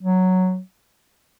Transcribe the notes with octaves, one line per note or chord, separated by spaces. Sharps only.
F#3